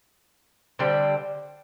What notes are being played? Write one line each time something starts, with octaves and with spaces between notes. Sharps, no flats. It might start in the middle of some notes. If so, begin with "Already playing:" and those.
D3 G3 C4